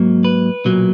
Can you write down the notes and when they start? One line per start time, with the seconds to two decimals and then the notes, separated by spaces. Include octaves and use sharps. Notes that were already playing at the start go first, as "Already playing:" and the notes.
Already playing: G#2 F#3 A#3
0.24 B4
0.65 B1 A#2 F#3 A#3